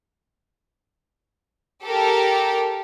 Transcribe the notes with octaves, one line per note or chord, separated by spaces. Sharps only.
G4 A4 A#4